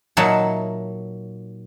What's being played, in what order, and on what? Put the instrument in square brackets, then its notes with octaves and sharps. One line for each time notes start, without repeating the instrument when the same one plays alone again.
[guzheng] A#2 F#3 D#4 E5 F#5 A5